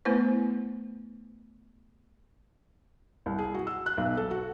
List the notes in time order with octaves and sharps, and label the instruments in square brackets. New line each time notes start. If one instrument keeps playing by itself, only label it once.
[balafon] A3 B3 E4 B4 C5
[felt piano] C2
G#4
F#4
E6
F#6
B1
A4
F#4